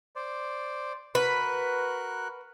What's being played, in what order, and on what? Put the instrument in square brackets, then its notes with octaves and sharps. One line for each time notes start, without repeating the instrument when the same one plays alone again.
[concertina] C5 D5
[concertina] F#4 A#4 F#6 [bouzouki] B4